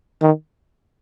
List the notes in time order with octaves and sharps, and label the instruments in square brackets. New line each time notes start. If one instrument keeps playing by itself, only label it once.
[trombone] D#3